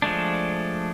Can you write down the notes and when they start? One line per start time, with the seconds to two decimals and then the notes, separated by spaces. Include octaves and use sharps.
0.02 F3 G#3 A3 D4